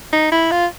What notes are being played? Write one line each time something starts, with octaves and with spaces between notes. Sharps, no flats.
D#4
E4
F4